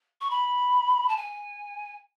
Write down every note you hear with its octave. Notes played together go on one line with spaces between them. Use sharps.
C#6
B5
A5
G#5